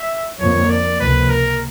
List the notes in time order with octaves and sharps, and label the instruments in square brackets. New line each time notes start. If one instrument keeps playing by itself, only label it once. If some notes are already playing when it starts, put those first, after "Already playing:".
Already playing: [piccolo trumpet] E5
[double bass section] F2 D3 F3 A#3 [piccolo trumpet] C#5
[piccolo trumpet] D5
[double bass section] C#2 C3 F3 A#3 [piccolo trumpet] B4
[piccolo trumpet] A#4